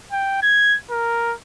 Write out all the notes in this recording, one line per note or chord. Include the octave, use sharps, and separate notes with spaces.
G5
G#6
A#4